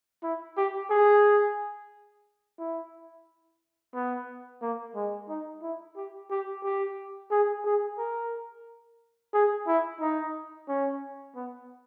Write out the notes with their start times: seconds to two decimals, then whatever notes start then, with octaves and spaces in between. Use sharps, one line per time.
0.23 E4
0.57 G4
0.91 G#4
2.59 E4
3.94 B3
4.62 A#3
4.95 G#3
5.29 D#4
5.63 E4
5.96 G4
6.30 G4
6.64 G4
7.31 G#4
7.65 G#4
7.98 A#4
9.34 G#4
9.67 E4
10.00 D#4
10.68 C#4
11.35 B3